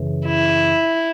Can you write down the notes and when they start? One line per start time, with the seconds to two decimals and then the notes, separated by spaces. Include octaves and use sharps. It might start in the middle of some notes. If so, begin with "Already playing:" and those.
Already playing: F#2 C#3 E3
0.26 E4